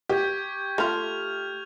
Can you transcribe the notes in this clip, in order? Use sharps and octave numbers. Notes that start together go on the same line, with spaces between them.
G4 C#6 G6 G#6
A3 F4 F6 F7